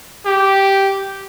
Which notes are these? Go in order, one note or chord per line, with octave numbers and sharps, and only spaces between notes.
G4